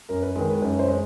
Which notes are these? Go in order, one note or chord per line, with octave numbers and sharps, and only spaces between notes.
F#2 A#4
B4
D#3 G#3
B4
F#2 B4
C5
G#3